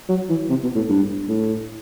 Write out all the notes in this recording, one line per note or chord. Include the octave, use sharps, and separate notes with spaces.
F#3
E3
C3
B2
A2
G2
A2